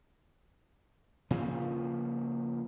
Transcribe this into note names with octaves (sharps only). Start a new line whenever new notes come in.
A#2 C#3 F3